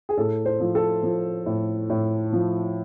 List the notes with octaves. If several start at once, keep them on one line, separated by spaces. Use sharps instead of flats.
G#4
A2 A4
C5
F3
A4
F3
A2
A2
F3